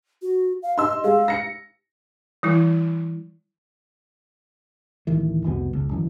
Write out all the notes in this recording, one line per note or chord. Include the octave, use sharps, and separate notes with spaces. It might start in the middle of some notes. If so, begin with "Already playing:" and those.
F#4
F5
D#5 C6 E6
G#3 F5
A#6 C#7
E3 G3 E4
D1 A1 D#3 E3
F1 C2 B2
F#1 C#2
G1 F#2 E3